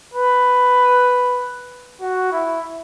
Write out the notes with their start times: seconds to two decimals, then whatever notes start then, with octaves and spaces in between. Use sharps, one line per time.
0.14 B4
2.01 F#4
2.32 E4